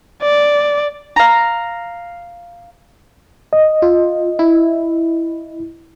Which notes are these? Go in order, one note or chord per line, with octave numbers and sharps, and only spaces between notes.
D5
F5 A#5
D#5
F4
E4